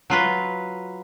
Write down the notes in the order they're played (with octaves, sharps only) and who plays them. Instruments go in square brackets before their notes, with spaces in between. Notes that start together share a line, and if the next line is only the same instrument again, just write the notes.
[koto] F#3 F4 B4